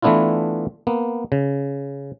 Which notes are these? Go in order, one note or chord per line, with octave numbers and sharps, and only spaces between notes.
E3 A3 B3 D4 E4 F4
A#3 B3
C#3